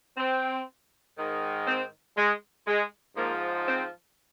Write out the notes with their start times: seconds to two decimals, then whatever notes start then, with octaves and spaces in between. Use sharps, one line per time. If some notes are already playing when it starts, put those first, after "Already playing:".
0.17 C4
1.17 G#2 D#3
1.67 C4
2.17 G#3
2.67 G#3
3.16 G#2 F3 A#3
3.66 C4